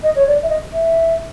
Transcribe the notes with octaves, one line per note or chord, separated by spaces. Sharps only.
D#5
C#5
D5
E5
D#5
E5